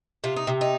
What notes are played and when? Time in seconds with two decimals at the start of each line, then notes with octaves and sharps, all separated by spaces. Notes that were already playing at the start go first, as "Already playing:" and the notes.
0.24 C3 F4
0.36 D#4
0.47 C3
0.61 D#4